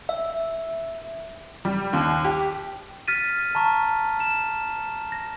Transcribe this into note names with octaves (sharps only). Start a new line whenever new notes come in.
E5
G3
D#2
G4
F6 A6 B6 D#7
A5 A#5 C#6
E7
A#6